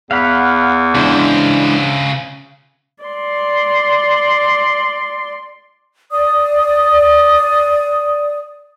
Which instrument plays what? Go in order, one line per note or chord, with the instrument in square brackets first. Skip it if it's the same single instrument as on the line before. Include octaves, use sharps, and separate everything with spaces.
[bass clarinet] E2 [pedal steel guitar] F5 F#5 B5
[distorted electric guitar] C#3 C5 [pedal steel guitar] E3 G#3 D4
[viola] D5 C6
[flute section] D5 D#6